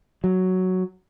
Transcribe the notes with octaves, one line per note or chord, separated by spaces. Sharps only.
F#3